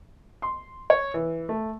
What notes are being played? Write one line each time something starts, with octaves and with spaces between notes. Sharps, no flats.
C6
C#5
E3
A3